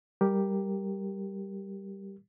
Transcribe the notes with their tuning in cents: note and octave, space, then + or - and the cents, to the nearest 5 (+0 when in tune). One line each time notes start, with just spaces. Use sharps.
G3 +0 G4 +0 A#4 +0